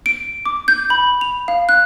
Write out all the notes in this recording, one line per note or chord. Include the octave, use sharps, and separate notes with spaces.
D7
D6
G6
B5
F7
F5
F#6